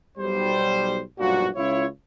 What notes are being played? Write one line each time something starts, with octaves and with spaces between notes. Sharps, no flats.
B1 G3 C5
B1 G2 A#2 F3 F#4
C#2 C#4 E4 F4 C#5